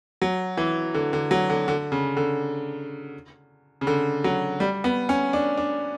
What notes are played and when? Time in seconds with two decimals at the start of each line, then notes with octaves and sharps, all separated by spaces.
0.22 F#3
0.57 E3
0.94 D3
1.13 D3
1.31 F#3
1.50 D3
1.68 D3
1.92 C#3
2.17 D3
3.81 C#3
3.87 D3
4.24 F#3
4.60 G3
4.84 B3
5.09 C#4
5.33 D4
5.57 D4